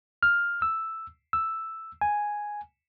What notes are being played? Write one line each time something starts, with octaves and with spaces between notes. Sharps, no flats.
F6
E6
E6
G#5